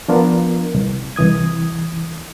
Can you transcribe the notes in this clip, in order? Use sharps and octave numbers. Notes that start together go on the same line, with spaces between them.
F3 B3 D4 F4 A#4
C2
C2 E3 D#6 G#6